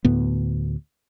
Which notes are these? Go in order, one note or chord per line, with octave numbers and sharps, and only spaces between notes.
D2 A2 B3